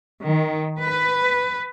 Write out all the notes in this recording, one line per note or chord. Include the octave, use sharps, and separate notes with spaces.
D#3
B4